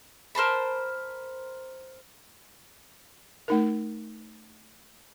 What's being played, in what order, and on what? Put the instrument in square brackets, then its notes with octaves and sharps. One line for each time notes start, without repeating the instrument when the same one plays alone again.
[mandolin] A#4 C5 A5 B5
[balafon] A3 D#4 A#4